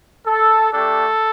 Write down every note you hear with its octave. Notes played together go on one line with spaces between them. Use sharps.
A4
A3 D4 G4 A4